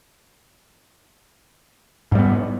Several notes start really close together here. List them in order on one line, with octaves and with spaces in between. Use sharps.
G#2 G3 B3